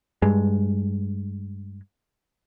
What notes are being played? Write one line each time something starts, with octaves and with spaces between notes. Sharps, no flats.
G2 G#3